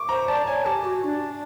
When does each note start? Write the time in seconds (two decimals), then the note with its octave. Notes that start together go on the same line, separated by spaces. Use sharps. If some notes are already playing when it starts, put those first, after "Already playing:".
Already playing: C#6 D6
0.09 C5 A#5
0.27 D5 A5
0.46 C#5 G#5
0.65 G4 A5
0.84 F#4
1.04 D4